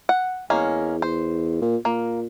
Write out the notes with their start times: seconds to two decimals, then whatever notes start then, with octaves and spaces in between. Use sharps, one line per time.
0.09 F#5
0.50 E2 G#3 A#3 C#4
1.02 C5
1.62 A#2
1.85 A#2 A#3